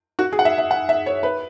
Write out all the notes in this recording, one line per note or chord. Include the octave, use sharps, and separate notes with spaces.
F#4
G#4
F#5
E5
E5
F#5
E5
C#5
B4